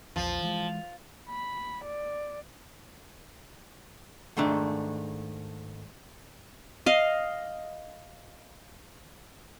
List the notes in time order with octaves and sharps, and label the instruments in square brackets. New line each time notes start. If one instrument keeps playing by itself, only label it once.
[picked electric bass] A#1 E2 [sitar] F3
[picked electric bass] E3 G#3
[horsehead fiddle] B5
D5
[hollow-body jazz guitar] G#2 D#3 A3 D4
[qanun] D#5 F5